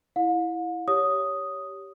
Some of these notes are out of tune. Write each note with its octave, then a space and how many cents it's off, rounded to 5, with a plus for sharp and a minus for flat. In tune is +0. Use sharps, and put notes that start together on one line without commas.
E4 +0 F5 +45
G4 +0 C#5 +10 D#6 +0